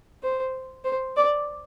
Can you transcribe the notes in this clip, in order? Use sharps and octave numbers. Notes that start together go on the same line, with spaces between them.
C5
C5
D5